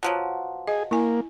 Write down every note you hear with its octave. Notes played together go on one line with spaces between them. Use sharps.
B2 F3 F#3
G#4 D#5
A#3 E4 G#5